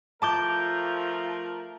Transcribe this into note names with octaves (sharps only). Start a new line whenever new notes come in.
F3 A3 A#4 A5 D6 G6